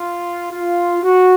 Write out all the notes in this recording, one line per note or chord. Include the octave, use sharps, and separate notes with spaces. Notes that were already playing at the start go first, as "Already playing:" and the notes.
Already playing: F4
F4
F#4